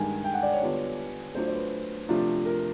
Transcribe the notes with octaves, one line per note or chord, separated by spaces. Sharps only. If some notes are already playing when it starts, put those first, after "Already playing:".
Already playing: G2 D#3 G#3 G#5
G5
F#5
D5
C#5
D3 G3 B3 D4 F4
F#3 A3 D4 F4 C5
C5
B4
C3 F3 A3 D4 F4
A#4